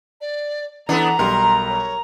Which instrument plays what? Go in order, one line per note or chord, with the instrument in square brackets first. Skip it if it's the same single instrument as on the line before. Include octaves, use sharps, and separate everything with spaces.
[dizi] D5
[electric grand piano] E3 A4 [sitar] B3 D4 [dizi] F#5 [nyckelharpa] A#5
[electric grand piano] B1 G3 [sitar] A#4 [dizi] C6
[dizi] C#5